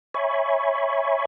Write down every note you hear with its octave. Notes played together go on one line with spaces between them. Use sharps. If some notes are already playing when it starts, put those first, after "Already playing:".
C#5 E5 G#5 B5 C#6